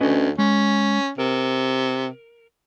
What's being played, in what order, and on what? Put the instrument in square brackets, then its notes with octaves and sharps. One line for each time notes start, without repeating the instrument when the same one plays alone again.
[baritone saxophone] D2 [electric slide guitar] C#4 B4 D#5
[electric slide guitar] G#3 [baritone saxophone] C#4
[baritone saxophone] C3 [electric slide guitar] A#4